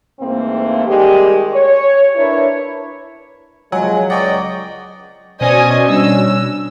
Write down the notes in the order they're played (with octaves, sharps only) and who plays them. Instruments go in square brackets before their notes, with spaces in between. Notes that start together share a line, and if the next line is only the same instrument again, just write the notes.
[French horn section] G#2 E3 A3 A#3 C4
D#3 G3 G#3 G4
C#5
D4 E4 A#4 B4 C#5
[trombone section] C3 F3 G#3 [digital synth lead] F#3 [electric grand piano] F#5 G#5
[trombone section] C#2 [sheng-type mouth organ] D5 D#5 [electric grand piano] F#5 G5 C#6
[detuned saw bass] B2 [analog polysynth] C#4 [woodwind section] C5 D5 [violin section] D#5 G#5
[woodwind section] G3 D4 [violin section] E6